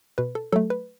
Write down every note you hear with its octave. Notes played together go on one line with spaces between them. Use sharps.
B2 B4
A4
F#3 A3 A4
B4